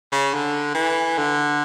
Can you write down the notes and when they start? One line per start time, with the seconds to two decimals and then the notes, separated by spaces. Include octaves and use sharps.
0.12 C#3
0.34 D3
0.75 E3
1.17 D3